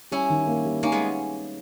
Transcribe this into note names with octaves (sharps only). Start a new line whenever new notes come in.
G3 C#4 E4
D#3
A#3
G3
A#3 C#4 D#4
G#3 B3